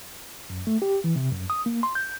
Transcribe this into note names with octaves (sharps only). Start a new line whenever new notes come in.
F#2
A3
G4
E3
C3
F#2
D#6
A#3
C6
G6